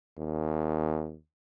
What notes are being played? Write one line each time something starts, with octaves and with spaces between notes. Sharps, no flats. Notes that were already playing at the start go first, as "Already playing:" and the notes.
D#2